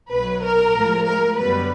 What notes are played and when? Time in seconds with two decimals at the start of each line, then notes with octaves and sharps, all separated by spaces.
0.11 B1 B2 F#3 B4
0.42 A#4
0.73 A2 F3 G#3
1.05 A#4
1.36 F#2 D3 G3 B3 B4